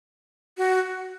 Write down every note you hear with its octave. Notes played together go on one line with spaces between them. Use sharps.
F#4